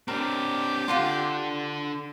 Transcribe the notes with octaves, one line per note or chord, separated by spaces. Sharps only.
C4 D4 G4 A#4
D4 F4 A4 F#5 C6